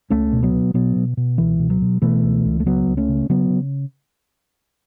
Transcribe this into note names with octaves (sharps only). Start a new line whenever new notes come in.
C#2 A3 C#4
B2
F#3 B3
B2
B2 F#3 B3
B2
B2
C#2 E3
B2
F#3
B2
B2 E3 A3
C#2
C#2
A3
C#3 F#3 B3
C#2
A3 C#4
C#3
C#3 F#3 B3
C#3